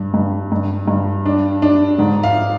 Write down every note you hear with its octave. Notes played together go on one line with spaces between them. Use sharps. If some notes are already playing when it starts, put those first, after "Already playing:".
Already playing: G2
G2
G2
G2
D4
D4
G#2
F5